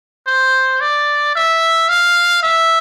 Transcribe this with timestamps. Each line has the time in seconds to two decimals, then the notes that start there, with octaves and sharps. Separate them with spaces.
0.27 C5
0.81 D5
1.35 E5
1.89 F5
2.43 E5